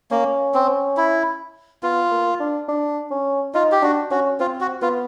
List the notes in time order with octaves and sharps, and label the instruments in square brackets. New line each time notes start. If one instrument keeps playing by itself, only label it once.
[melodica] A#3 [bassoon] C#4
[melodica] C4
E4
[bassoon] B3 [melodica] F4
[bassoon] A#3
D4
D4
C#4
[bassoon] D#4 [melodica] F4
[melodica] G4
[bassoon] D4 [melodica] F#4
[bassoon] C#4 [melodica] F#4
[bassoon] C4 [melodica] F4
[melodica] F#4
[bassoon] B3 [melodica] F4